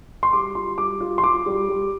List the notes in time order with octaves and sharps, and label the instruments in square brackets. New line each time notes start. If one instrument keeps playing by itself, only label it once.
[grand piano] C6
G3 D6
F4 C6
G3 D6
F4
C6
F4 D6
G3
G3